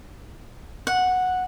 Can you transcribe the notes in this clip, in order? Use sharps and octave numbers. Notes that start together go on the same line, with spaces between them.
F#5